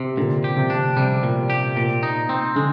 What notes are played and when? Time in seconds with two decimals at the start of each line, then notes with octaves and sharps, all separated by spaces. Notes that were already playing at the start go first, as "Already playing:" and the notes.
Already playing: C3
0.17 A#2 D3
0.44 G4
0.57 C3
0.70 D4
0.96 C3 G3
1.23 A#2
1.50 G4
1.77 A#2
2.03 D#4
2.29 C4
2.56 D3 G#3